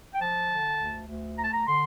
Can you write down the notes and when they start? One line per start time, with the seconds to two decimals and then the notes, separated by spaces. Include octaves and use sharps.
0.13 G5
0.19 F3 A5
0.48 D3
0.77 D2
1.07 D2
1.37 A3 A#5
1.44 A5
1.52 A#5
1.66 D3 C6